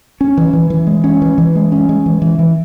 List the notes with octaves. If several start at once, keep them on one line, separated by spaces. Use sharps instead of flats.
C#4
E3
E3
E3
G#3
C#4
E3
E3
G#3
C#4
G#3
E3
E3
E3